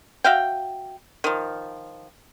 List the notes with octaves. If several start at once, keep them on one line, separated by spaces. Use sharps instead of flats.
F#4 E5 F5 G5
D#3 F3